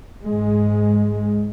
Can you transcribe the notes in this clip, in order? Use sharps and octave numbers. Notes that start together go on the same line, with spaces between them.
G#2 G#3